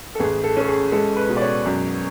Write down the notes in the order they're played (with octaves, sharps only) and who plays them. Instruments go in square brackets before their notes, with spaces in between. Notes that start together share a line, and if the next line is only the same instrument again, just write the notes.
[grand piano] A4
A1 G#4
A4
C#4 A4
G#4
G#3 A4
B4
B2
D5
C#5
F#2